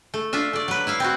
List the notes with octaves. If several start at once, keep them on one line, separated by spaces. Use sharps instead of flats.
A3
D4 F4 E5
A3 D5
F#3 B4
E4 E5 F5
C4 E4 F#4